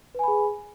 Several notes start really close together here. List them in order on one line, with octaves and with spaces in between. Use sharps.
B4 G#5 B5 G#4